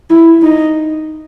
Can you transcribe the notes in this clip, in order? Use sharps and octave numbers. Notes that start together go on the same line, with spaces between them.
E4
D#4